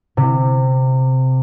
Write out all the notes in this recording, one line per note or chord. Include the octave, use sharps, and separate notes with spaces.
C3